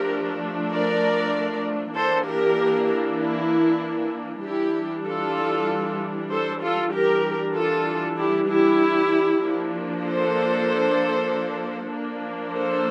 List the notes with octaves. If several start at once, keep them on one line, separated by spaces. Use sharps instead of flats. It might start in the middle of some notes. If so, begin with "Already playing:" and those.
Already playing: F3 A3 D4 G4 A#4
A#4 D5
E3 A#3 D4 A4 C5
G4 A#4
E4
E3 G3 D4 E4 G4
F4 A4
A4 C5
F4 A4
E3 G3 D4 G4 A#4
F4 A4
E4 G4
E4 G4
F3 A#3 D4
A4 C5
F3 A#3 D4
A4 C5